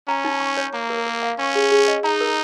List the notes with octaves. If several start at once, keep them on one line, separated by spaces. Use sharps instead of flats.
C#4 A#5
D#4
C#6
C#5
A#3 A#5
A#4
A#4
F5
C#4 C#6
G#4
G#4
D#5
D#4 A#5
A#4